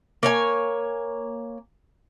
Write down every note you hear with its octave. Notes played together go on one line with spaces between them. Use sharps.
A#3 C#5 G#5